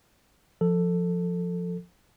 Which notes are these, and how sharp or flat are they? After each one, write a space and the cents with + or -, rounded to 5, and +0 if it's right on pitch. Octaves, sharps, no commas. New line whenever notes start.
F3 +0 A4 +10